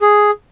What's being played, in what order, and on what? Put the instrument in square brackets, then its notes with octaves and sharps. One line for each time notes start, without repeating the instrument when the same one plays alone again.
[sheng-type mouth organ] G#4